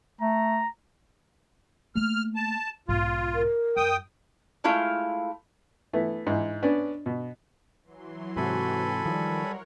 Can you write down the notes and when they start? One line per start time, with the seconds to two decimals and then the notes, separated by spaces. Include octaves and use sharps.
0.21 A3 A#5
1.95 A3 A#3 F6
2.36 A5
2.88 B1 G#2 F4
3.35 A#4
3.76 F#2 G5 D#6
4.64 G#3 A3 E4 F4 F5
5.93 E3 A3 B3
6.27 G#2 E3
6.63 B3 C#4 D4 D5
7.06 B2
7.84 E3 F#3 C6
8.37 G#2 C3 F#4 A4 G#5 B5
9.06 D#3 F3 G3 A#4 C#5 F#5